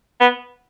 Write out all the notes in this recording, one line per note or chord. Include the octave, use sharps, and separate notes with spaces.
B3